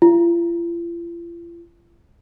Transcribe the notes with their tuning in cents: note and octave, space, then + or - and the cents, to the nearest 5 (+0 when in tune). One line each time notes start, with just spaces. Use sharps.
F4 -45